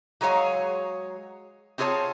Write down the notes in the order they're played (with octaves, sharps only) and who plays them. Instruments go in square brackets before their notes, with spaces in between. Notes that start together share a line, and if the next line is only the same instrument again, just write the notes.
[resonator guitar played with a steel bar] F#3 G#3 G#4 C#5 F5
C4 F4 G#4 C5 C#5 A5